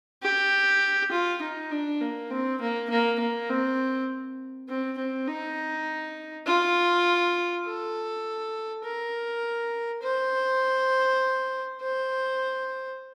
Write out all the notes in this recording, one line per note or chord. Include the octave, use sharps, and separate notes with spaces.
G4
F4
D#4
D4
A#3
C4
A#3
A#3
A#3
C4
C4
C4
D#4
F4
A4
A#4
C5
C5